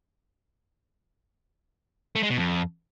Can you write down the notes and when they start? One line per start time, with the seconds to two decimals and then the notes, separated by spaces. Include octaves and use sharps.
2.16 A3
2.23 G#3
2.30 B2
2.38 F2